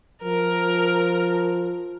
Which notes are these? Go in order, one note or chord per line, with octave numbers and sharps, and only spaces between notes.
F3 A#4